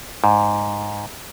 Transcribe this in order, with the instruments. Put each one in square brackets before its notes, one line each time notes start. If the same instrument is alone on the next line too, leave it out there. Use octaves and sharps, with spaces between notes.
[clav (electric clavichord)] G#2